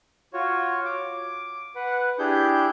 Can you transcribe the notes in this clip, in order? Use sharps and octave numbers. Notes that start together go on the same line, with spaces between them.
F4 F#4 C#5
D6
B4 F#5
D4 E4 G4 G#4 G6